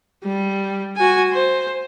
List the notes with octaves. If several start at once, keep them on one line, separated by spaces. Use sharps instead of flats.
G3
F#4 G#5
C5